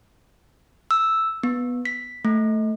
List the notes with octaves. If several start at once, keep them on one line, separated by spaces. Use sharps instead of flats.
E6
B3
B6
A3